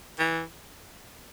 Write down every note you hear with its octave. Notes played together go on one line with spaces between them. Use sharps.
E3